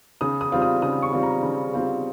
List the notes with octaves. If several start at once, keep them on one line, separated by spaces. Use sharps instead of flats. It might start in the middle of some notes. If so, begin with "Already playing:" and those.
C#3 D#6
D#6
G3 C4 F4
D#6
C#3 D#6
C#6
G3 C4 F4
A#5
C#3
G3 C4 F4